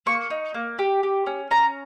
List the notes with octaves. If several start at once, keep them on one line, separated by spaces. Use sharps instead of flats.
A#3 C#6
D#4
A#3
G4
G4
C#4
C#4 A#5